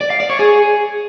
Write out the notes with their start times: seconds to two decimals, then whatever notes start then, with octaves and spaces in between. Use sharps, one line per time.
0.01 D5
0.10 F5
0.20 D5
0.30 C#5
0.39 G#4